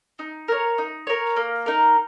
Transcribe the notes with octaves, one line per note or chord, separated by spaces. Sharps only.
D#4
A#4 C#5
D#4
A#4 C#5
A#3
D#4 A#4